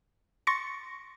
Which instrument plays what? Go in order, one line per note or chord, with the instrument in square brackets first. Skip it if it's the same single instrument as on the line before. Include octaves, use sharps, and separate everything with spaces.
[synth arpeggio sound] C6 C#6 A6 A#6 C#7